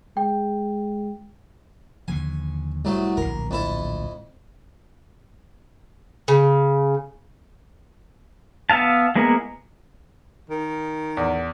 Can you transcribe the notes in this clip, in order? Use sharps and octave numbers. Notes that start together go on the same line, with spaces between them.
G#3 G5
D#2 D3 F3 G#5
C2 F#3 A3
D1 A#1 A#4
F2 E4 A4
C#3
B3 E5 F5 A5
G#3 A#3 B3 E4 A#4
D#3
E2